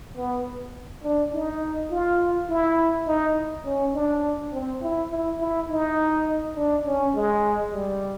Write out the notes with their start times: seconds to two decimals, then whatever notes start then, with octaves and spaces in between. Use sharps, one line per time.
0.16 B3
1.04 D4
1.33 D#4
1.91 F4
2.49 E4
3.07 D#4
3.65 C#4
3.94 D4
4.53 C4
4.82 E4
5.11 E4
5.40 E4
5.69 D#4
6.56 D4
6.86 C#4
7.15 G#3
7.72 G3